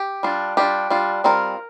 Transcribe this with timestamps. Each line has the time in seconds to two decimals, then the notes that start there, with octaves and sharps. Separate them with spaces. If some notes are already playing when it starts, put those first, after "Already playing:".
Already playing: G4
0.23 G3 D4 F4
0.57 G3 D4 F4 G4
0.90 G3 D4 F4
1.24 G3 C4 F4 A#4